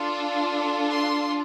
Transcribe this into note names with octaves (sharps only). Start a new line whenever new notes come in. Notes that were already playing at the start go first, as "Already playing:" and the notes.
Already playing: D4 F4 A4
C6